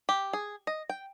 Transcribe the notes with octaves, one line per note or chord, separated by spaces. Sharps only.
G4
G#4
D#5
G5